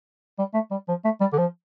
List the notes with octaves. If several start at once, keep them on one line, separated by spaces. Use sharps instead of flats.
G3
A3
G3
F3
A3
G3
D3
F3